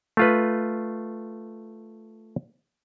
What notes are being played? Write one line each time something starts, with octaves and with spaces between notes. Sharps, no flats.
A3 F4 B4